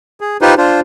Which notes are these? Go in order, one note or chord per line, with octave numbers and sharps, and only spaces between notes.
G#4
D#4 F4 G4 B4 C5
D4 F4 C5